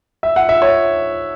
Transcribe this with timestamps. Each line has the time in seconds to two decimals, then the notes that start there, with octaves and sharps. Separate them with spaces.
0.23 E5
0.36 F#5
0.49 E5
0.62 C#5